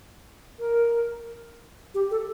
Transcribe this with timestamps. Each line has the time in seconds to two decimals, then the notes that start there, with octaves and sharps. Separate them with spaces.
0.59 A#4
1.94 G4
2.11 A4